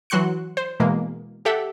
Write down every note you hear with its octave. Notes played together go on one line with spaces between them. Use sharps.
E3 F#3 F#4 C6 F#6 C#7
C5
B2 E3 G#3 A#3
G4 A4 E5 F#5